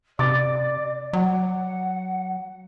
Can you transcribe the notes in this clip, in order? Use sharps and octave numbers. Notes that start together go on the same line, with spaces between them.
C3 D5 D6 A6
F#3 F#5